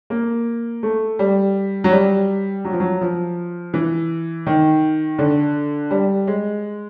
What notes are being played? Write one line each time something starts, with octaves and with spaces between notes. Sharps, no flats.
A#3
A3
G3
F#3
G3
F#3
F3
F#3
F3
E3
D#3
D3
G3
G#3